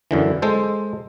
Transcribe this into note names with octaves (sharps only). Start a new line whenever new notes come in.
F#2 D3 E3
G#3 A4 C5